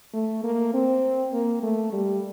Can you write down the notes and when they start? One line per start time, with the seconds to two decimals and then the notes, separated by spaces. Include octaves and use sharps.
0.14 A3
0.44 A#3
0.74 C4
1.32 A#3
1.63 A3
1.92 G3